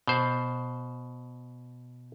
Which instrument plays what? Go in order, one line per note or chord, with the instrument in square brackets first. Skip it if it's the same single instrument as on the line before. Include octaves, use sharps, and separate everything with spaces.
[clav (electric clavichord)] B2 C5